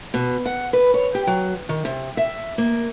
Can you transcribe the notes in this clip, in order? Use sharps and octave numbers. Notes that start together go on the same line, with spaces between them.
B2
F#5
B4
C#5
G4
F#3
D#3
C3
E5
A#3